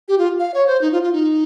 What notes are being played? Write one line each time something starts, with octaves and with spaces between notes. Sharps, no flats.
G4
F4
F5
C#5
C5
D#4
F4
F4
D#4